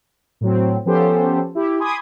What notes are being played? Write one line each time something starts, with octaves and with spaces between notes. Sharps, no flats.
A2 F#3 C4
F3 B3 C#4 G4 A4 C5
E4 G4
G#5 B5 C6 D6 D#6 G#6